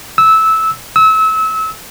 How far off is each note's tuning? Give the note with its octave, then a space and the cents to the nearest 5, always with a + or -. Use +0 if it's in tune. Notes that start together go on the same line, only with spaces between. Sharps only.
E6 -15
E6 -30